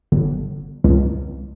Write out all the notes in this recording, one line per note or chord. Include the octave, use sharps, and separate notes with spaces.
G1
C#2